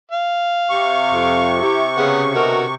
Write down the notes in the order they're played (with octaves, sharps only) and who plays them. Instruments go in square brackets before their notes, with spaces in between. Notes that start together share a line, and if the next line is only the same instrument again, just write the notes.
[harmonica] F5
[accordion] C3 C#6
[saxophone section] F2
E4 G4
[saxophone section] C#3 [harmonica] B3
[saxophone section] B2 D3 A#4 [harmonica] F#4